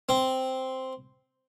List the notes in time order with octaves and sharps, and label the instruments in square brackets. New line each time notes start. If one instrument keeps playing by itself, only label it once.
[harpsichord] C4